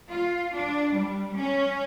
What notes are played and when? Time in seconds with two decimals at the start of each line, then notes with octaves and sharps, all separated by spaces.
0.11 F4
0.54 D4
0.94 G3
1.37 C#4